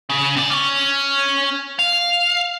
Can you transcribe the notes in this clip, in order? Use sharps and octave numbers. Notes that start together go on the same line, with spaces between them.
C#3
C3 D5
C#4 C#5
F5